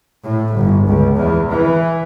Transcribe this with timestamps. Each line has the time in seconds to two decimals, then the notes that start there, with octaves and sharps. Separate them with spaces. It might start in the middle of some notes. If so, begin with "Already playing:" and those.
0.23 A2
0.55 G1
0.86 C#2
1.16 E2
1.51 E3